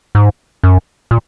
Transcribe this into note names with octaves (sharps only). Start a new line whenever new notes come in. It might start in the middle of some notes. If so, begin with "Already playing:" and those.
G#2
F#2
A#2